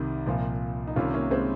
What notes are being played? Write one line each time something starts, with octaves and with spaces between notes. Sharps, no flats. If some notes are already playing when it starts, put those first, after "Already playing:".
Already playing: C2 C3 D#3
C2 A#2 F3
D#4
C2 C3 D#3 C#4 F4
A#3 C#4
G#3 C4